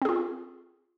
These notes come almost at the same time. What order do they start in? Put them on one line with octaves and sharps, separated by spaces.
C4 G#4 F4